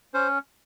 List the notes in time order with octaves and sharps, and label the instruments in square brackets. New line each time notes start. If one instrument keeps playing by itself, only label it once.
[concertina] C#4 C5